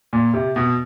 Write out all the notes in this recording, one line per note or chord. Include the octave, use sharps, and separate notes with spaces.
A#2
C3
B2